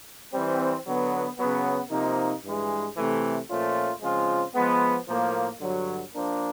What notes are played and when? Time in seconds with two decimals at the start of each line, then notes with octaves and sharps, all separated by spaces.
0.34 E3 G3 C4
0.86 D3 F#3 B3
1.39 C#3 F#3 B3
1.91 C3 F3 A#3 D#4
2.44 G2 E3 G#3
2.97 C3 E3 A3
3.49 A#2 F3 A3 C#4 F4
4.02 C#3 F3 G#3 C4 F4
4.55 F3 G#3 B3
5.08 A2 F3 A#3
5.60 G2 D3 F#3
6.13 F3 A#3 D4